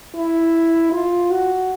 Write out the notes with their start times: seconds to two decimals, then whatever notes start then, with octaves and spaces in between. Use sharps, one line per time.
0.15 E4
0.92 F4
1.31 F#4